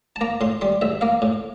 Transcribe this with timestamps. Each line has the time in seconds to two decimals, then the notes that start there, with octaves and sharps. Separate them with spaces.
0.16 A5
0.21 A#3 A#5
0.41 A2 C6
0.61 G3 C6
0.81 A1 E5
1.01 A#3 F5
1.22 A2